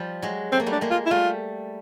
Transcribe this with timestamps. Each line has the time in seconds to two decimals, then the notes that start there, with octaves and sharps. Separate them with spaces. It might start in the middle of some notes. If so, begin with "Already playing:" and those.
Already playing: F3 G3
0.22 F#3 G#3
0.52 A3 C4
0.60 A#3
0.66 G3 A3
0.72 D4
0.81 G#3 A#3
0.91 F4
1.06 E4
1.11 G3 A3 F4